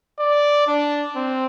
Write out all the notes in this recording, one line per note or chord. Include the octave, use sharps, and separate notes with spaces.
D5
D4
C4